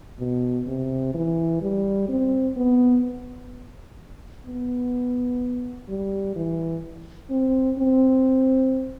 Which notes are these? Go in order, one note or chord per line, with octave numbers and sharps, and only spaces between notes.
B2
C3
E3
G3
C4
B3
B3
G3
E3
C4
C4